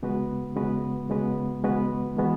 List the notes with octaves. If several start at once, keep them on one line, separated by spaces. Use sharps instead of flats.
C#3 G#3 B3 F#4 B4
C#3 G#3 B3 F#4 B4
C#3 G#3 B3 F#4 B4
C#3 G#3 B3 F#4 B4
E3 G#3 B3 F#4